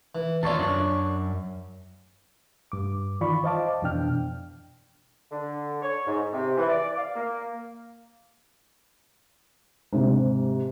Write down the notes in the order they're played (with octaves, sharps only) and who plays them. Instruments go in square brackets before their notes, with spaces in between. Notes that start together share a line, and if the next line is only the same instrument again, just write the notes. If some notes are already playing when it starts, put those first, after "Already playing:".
[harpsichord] E3
[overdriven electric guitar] D#2 D5 [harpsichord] F4 C#5 A5
[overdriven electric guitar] F#2 [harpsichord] D4 C#5
[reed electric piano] G2 D6
D#3 E3 F4 D5 B5 C#6
C5 D#5 F5 A5 D6
F2 B2 E3 D4 G5 F6
[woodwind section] D3
C#5
G#2
C3
E3
D5
F5
A#3
[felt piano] G#2 C3